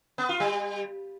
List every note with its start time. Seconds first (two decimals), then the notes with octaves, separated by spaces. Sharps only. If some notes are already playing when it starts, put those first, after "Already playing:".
0.18 B3
0.29 F4
0.40 G3